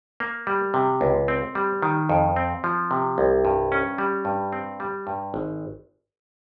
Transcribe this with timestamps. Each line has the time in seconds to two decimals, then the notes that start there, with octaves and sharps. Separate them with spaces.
0.20 A#3
0.47 G3
0.74 C3
1.01 C#2
1.28 C4
1.55 G3
1.82 D#3
2.09 F2
2.36 C4
2.64 F3
2.91 C3
3.18 C2
3.45 G2
3.72 C#4
3.98 G3
4.25 G2
4.53 C4
4.80 G3
5.07 G2
5.34 G#1